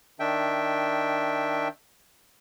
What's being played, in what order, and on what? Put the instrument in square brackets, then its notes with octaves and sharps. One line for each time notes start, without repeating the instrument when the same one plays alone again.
[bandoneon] D#3 D4 E5 G5